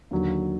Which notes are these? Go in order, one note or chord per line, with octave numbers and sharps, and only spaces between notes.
D#2 D3 F#3